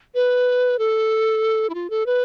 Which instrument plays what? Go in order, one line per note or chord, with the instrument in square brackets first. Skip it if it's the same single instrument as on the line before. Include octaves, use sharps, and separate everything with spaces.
[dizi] B4
A4
E4
F4
A4
B4